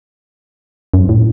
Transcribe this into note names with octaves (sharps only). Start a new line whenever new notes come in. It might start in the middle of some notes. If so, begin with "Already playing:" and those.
F#2
A2